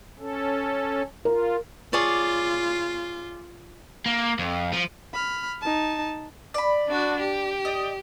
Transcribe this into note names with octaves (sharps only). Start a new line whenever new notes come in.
C#4 A4
F4 A#4
F4 G#4 C#5 D5
A#3
F2
F3
B5 F6
D#4 A5
D5 B5
D4 F#4
G4
D5 D#5